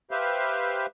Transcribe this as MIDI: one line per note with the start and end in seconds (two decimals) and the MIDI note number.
0.11 0.86 67
0.11 0.86 71
0.11 0.86 72
0.11 0.86 76
0.11 0.86 77